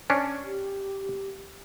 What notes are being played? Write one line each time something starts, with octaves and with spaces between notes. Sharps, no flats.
C#4 D4
G4